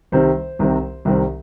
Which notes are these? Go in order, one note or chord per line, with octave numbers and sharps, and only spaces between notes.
C2 C3 D#3 G3 C4 C5
C2 C3 D#3 G3 C4
C2 C3 D#3 G3 C4